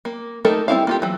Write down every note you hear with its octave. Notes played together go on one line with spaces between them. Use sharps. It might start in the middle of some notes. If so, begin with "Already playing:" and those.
A#3
A3 A#3 D#4 A4 A#4
G3 C4 E4 F5
A#3 F4 G4
E3 F#3